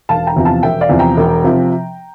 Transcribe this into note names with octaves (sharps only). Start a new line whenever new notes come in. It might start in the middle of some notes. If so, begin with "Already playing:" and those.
E1 F5 A5
G5 A#5
E2 C3 F3
F5 A5
E1 E5 G5
D5 F5
E2 C3 F3
G5 A#5
E1
C3 F3